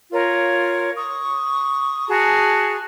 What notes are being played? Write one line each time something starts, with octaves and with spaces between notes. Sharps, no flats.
F4 A#4 C#5
C#6 D#6
F#4 G#4 A5 A#5